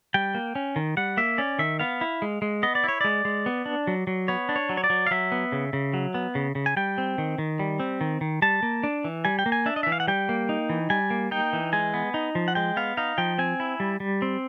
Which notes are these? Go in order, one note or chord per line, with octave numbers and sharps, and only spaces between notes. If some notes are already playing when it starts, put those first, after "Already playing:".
G3 G5
A#3
C#4
D#3
G3 F#5
A#3 E5
C#4 D5
D#3 E5
B3 F5
E4
G#3
G#3
B3 D#5
D5
E4 C#5
G#3 D5
G#3
B3
D4
F#3
F#3
B3 C#5
D4
C#5
F#3
C#5
D5
F#3
F5
F#3 E5
B3
C#3
C#3
F#3
B3
C#3
C#3
G#5
G3 G5
C4
D#3
D#3
G3
C4
D#3
D#3
G3 A5
A#3
D4
E3
G3 G#5
G5
A#3
G#5
D4 E5
D#5
E5
E3
F5
F#5
G3 G5
A#3
D#4
E3
G3 G#5
A#3
D#4 G5
E3
G#3 G#5
B3
D#4
F3
F#5
G#3 G5
B3 F5
D#4 F5
F3 G5
C4 G#5
E4
G3
G3
C4